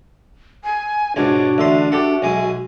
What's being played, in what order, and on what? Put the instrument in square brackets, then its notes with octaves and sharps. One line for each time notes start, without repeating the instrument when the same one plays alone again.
[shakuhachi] G#5
[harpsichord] C#2 G#2 B2 [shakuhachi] D4 [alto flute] F#4 [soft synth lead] G#6
[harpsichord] A1 D3 C6 [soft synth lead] E5
[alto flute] F#4 [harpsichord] G4 A4 F#5
[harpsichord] B1 G#3 D#6 [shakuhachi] G#5